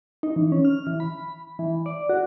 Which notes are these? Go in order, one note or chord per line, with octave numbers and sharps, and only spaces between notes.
D#4
E3
C#4
F6
E3
B5
E3
D5
F#4